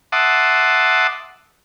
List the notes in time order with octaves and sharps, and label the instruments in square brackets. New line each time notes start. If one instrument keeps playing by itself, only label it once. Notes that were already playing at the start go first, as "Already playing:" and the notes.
[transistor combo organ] E5 F#5 A5 C6 D6 D#6